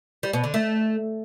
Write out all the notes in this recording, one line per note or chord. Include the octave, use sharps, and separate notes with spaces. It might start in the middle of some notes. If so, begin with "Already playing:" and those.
G3
B2
D3
A3